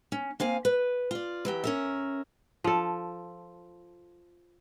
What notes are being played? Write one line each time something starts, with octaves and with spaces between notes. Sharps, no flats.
C#4
A#3 C4 F5 G#5
B4
F4 D5
E3 F#3 G4
C#4 A#4 E5
F3 A4